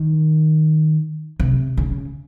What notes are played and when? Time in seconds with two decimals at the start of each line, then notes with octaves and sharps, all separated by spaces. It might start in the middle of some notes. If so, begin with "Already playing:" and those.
Already playing: D#3
1.40 C3
1.77 C#3